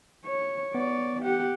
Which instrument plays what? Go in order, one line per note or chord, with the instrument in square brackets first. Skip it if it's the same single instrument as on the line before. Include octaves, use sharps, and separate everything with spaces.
[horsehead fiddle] C#5
[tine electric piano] B3 [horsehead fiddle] C#5 D5
[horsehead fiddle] G4 F#5